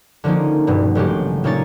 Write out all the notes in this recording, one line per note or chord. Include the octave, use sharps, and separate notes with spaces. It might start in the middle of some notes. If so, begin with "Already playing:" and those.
D3 F3 A#3 C#4 D#4
D#1 G2 B2
A1 C#3 F#3 G#3 A3 G4
A#2 A#3 C#4 D#4 C#5 A6